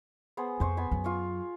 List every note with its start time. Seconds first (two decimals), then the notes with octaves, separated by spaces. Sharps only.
0.37 B3 G#4 C5
0.60 F2 B4 C5 C#6
0.77 B3 G#5 B5
0.91 F#2 F#3
1.04 F4 C6 C#6